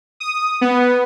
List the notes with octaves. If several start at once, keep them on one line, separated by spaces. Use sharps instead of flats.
D#6
B3